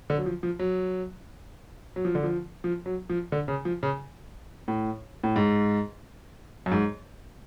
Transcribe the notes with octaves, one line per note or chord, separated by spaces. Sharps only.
D3
F#3
F3
F3
F#3
F#3
F3
D3
F3
F3
F#3
F3
D3
C#3
F3
C#3
A2
A2
G#2
F#2
G#2